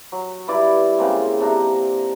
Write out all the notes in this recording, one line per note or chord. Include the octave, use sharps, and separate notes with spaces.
F#3
G2 E4 B4 D5
C#3 G#3 A#3 C4
C3 D4 D#4 A#5